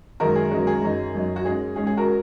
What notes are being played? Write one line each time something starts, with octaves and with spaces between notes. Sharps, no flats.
F#2 D#3 G#3 C#4 F#4 A#4
G#4
F#2 D#3 G#3 C#4 F#4
G#4
F#2 F#3 D#4
F#2 F#3 D#4
F#4
G#2 G#3 C#4 G#4
G#2 G#3 C#4 G#4
G#4
F#4 A#4